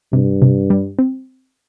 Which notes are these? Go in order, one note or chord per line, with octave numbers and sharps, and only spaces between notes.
G2 C3
C3
G3
C4